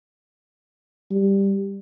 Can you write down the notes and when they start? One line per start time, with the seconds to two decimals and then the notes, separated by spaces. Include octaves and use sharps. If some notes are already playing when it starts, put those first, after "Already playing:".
1.11 G3